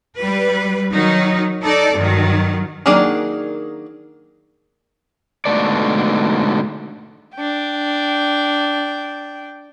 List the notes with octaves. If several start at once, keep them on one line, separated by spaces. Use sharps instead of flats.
G3 B4
D#3 F#3 D#4
D#4 A4 D5
G2 D#3 F#3
D#3 F#3 A#3 D4 G#4
G#2 B2 D3 A3 A4 D5
D4 G5